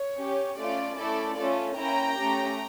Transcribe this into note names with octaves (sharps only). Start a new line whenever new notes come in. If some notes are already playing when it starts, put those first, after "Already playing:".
Already playing: C#5
C#4 G4
A3 C#4 F4 D5
A3 C#4 E4 A4 D5
A3 C#4 F4 A4
A#3 C#4 E4 G5 A#5
A3 C#4 G4